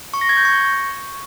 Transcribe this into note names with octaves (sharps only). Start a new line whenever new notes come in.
C#6
A#6
G#6
G6
C#6